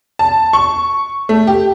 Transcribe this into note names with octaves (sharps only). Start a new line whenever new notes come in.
A5
C#6
A3
G4